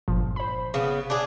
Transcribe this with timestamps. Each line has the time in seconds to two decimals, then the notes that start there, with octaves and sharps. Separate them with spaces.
0.08 G1 A#2 F3
0.36 C5 B5
0.74 C#3 B3
1.10 D4 G#4 F#6